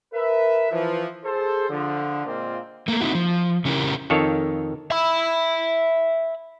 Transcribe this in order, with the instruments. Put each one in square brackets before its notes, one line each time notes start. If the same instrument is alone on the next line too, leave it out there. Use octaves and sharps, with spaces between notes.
[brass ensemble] A#4 B4 E5
E3 F3
G#4 A4 C5
D3 F3
A#2 G#3 A#3 C4 F4
[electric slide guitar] A3 A#3
C4 D#4 E4 F#4
F3
C#3 C#4 E4 G4 A#4
[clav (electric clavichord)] F2 D#3 A4 C#5 F5
[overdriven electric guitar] E5 B5